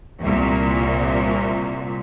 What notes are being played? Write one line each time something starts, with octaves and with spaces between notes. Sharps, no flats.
C2 A#2